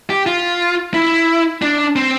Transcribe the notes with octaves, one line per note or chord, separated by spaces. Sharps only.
G4
F4
E4
D4
C4